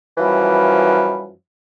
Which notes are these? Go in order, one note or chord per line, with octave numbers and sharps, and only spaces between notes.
F#2 E3 F3 G3